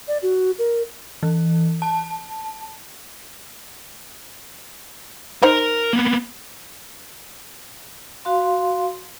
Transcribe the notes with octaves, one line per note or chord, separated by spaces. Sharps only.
D5
F#4
A#4
E3
A5
D#4 A#4 C5 G#5 A#5
A#3 B3
F#4 F5 C6